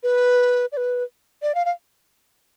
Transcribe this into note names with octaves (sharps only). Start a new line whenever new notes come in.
B4
D5
B4
D5
F5
F5